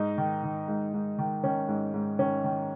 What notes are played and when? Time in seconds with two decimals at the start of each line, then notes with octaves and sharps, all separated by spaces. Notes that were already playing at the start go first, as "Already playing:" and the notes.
Already playing: G#2 D#4
0.18 D#3
0.43 D#3
0.68 G#2
0.94 G#2
1.19 D#3
1.44 D#3 C#4
1.68 G#2
1.94 G#2
2.19 D#3 C#4
2.44 D#3